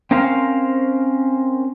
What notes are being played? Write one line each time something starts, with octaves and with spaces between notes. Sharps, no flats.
C4 C#4 A#4 C5 F5